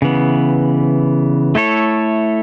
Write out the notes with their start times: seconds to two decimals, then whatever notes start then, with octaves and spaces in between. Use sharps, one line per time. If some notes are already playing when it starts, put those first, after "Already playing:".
0.02 C#3 E3 B3
1.55 A3 E4 A4 C#5